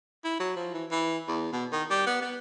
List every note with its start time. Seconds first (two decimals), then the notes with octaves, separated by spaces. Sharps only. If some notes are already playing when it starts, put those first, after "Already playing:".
0.24 E4
0.40 F#3
0.56 F3
0.74 E3
0.91 E3
1.28 E2
1.53 B2
1.72 D#3
1.91 G3
2.07 B3
2.22 B3